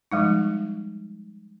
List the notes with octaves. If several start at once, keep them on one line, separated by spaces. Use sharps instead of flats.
F3 G3 G#3 D#4